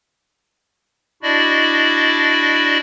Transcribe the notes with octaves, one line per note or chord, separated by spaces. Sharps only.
D4 E4 F#4 D5 D#5